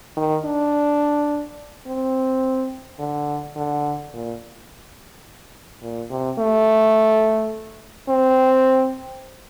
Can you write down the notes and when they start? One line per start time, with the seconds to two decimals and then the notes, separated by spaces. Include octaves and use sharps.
0.17 D#3
0.45 D4
1.87 C4
2.99 D3
3.56 D3
4.13 A#2
5.82 A#2
6.11 C3
6.39 A3
8.09 C4